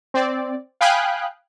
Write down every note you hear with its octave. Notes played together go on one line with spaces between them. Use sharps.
C4 D5
F5 G5 G#5 B5 D#6 F#6